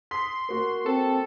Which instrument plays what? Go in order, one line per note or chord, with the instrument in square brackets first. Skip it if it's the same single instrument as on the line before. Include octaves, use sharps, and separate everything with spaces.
[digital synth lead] C6 [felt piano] D#6 B6
[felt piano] A#3 F#4 A#4
[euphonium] C4 [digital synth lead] A4